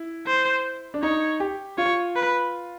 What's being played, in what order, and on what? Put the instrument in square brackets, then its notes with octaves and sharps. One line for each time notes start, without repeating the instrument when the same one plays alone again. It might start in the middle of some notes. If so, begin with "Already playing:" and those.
Already playing: [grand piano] E4
[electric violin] C5
[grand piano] D4
[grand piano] D#4 [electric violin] C#5
[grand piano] G4
[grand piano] F4 [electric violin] C#5
[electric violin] B4